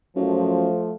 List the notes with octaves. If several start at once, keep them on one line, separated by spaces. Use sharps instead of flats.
F#2 F3 A3